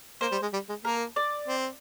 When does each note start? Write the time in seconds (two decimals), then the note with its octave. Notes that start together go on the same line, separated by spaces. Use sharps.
0.21 A#3 C5
0.32 G3
0.42 G#3
0.53 G3
0.69 G#3
0.85 A#3 A#4
1.16 D5
1.48 C4